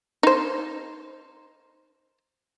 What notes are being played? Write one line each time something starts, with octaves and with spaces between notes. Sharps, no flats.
D#4 C5